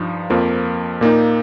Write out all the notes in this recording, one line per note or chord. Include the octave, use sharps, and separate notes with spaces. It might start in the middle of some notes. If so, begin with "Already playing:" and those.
Already playing: G2 F3 D#4
F2 F3 A#3
A#2 A#3 D#4